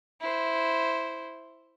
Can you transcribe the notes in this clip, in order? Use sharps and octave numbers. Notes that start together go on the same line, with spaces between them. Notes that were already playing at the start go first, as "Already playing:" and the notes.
E4 C5